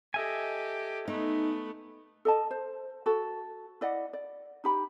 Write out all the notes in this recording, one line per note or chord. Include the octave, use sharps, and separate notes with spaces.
G4 A4 D#5 E5 G#5
A3 B3 D#4
A4 D#5 A5
C5
F#4 A4
E4 D5 D#5 F#5
D5
D#4 G4 B5